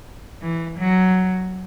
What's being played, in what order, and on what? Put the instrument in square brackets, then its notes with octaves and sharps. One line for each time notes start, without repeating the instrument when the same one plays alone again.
[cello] E3
F#3